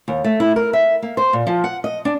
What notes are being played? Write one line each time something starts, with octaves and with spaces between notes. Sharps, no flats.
D#2
A3
E4
A#4
E5
A#3
C5
A#2
F3
F#5
D#5
D4